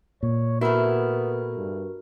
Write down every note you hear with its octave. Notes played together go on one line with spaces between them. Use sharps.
A#2 C#5
A3 B3 E4 F#4 A#4
G2